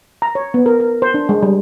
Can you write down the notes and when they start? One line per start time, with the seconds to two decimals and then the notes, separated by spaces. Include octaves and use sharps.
0.22 A#5
0.35 C#5
0.54 B3
0.66 A#4
0.80 A#4
1.02 C5
1.14 D4
1.29 G#3
1.43 G3